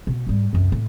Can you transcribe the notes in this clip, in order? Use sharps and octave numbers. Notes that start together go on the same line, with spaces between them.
B2
G#2 G3
C2 F#2
A2